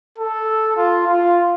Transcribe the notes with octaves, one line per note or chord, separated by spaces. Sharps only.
A4
F4
F4